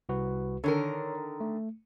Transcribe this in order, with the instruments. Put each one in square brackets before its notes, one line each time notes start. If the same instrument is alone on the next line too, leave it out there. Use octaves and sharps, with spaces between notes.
[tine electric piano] C2 F#4 B4
[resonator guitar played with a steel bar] D3 D#3 A#4 [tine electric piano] A4 C#5
[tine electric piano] A3